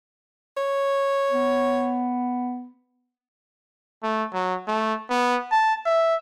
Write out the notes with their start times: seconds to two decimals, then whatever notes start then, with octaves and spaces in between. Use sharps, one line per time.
0.57 C#5
1.31 B3
4.03 A3
4.33 F#3
4.68 A3
5.10 B3
5.52 A5
5.86 E5